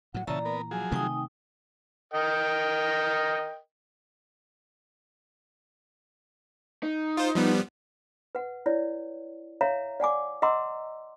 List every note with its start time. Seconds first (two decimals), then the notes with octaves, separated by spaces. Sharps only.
0.14 A2 F#3 F#5
0.27 A#2 C#3 E3 D5 E5 A5 A#5
0.45 B3 A#4
0.71 F3 F#3 G#4 G#5
0.92 C3 D#3 A3 D#4 G5 D#6
2.14 A#4 D#5 G5
6.83 D#4
7.17 F4 C5
7.35 F3 G3 B3
8.35 B4 F#5
8.66 E4 C#5 D5
9.61 C#5 E5 F5 A#5
10.00 D5 F#5 G#5 D6
10.42 D#5 F#5 A#5 C6 D6 E6